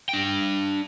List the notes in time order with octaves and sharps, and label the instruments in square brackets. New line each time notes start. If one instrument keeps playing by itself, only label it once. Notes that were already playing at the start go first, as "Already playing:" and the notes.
[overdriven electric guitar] D4 G5